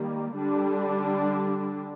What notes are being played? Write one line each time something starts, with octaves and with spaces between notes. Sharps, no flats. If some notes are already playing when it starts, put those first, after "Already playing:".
Already playing: D#3 G3 A#3
D3 G3 D4